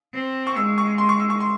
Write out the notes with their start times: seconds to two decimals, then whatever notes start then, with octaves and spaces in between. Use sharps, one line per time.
0.14 C4
0.47 C#6
0.56 G#3 E6
0.78 C#6
0.98 C6
1.09 C#6
1.20 E6
1.30 C#6
1.40 C6